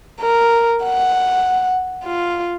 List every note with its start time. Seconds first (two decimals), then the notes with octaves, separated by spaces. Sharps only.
0.21 A#4
0.84 F#5
2.04 F4